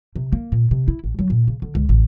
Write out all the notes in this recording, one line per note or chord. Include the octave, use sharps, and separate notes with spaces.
C3
A#3
A#2
C3
E4
A1
F#3
A#2
C#3
D3
C#2
A1